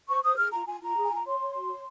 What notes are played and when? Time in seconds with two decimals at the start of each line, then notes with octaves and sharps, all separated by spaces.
0.09 C5 C#6
0.24 C5 D#6
0.37 G#4 F6
0.52 F4 A#5
0.67 F4 G#5
0.81 F4 A#5
0.97 G#4
1.04 G#5
1.11 F4 A#5
1.26 C#5 C6
1.40 C#5
1.55 F#4
1.69 C#5